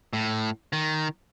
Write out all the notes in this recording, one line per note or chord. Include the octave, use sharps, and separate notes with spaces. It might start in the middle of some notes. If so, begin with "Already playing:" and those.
A2
D#3